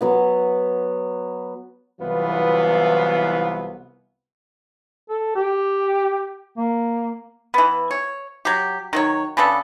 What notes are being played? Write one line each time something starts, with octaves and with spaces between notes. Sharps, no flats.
F#3 B3 F#5
C2 E3 F#3 B3 F4 B4
A4
G4
A#3
E3 B3
C#5
F#3 G4
D#3 F#3 C#5
C#3 B3 D4 A4